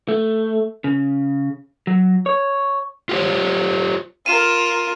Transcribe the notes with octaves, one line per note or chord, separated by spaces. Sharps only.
A3
C#3
F#3
C#5
F4 G4 C5 C#5
F4 A#4 D#7 E7